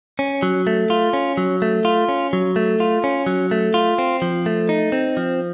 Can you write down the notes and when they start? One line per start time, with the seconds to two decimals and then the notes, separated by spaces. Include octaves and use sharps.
0.19 C#4
0.43 F#3
0.67 A3
0.90 F4
1.13 C#4
1.37 F#3
1.62 A3
1.85 F4
2.09 C#4
2.33 F#3
2.56 A3
2.80 F4
3.04 C#4
3.26 F#3
3.51 A3
3.74 F4
3.98 C4
4.22 F3
4.46 A3
4.69 D#4
4.92 C4
5.17 F3